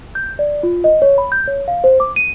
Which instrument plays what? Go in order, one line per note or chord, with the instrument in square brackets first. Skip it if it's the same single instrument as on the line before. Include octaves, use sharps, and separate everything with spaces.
[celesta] G6
D5
F4
D#5
C#5
B5
G6
C#5
F5
C5
D6
D#7